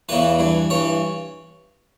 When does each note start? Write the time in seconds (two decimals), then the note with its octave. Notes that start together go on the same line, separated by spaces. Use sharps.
0.09 E2 C#3 E3 B4
0.39 G2 E3
0.70 G2 E3 C#5